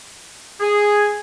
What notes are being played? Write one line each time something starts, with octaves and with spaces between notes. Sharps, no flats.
G#4